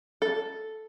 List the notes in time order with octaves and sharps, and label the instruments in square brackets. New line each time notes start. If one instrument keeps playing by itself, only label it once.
[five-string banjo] A4